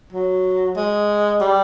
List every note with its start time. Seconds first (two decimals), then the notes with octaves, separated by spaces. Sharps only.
0.13 F#3
0.76 G#3
1.41 G3